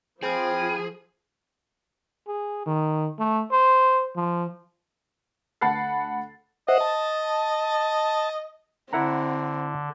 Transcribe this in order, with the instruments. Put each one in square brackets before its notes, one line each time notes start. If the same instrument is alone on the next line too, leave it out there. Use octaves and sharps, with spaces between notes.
[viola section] F3 [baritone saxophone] C4 [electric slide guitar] G#4 [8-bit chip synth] G5 B5 F6
[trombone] G#4
D#3
A3
C5
F3
[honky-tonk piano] D2 F#5 A5 B5 A6 C7
[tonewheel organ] C5 E5 F#5 [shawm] D#5
[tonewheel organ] A5
[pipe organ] D3 [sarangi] C4 [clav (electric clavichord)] E4 F#5 A#5